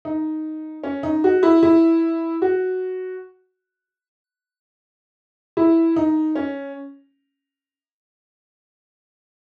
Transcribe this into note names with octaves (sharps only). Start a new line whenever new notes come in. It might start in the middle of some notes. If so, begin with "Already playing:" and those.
D#4
C#4
D#4
F#4
E4
E4
F#4
E4
D#4
C#4